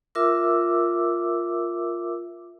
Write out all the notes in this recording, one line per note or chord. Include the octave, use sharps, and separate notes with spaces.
F4 A#4 E5 D6 E6